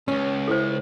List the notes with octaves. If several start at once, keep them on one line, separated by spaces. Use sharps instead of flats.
C#2 G2 C#4
E4 A4 C5